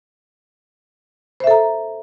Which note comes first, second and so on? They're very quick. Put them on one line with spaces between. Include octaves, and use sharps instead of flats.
C5 E5 A4 A#5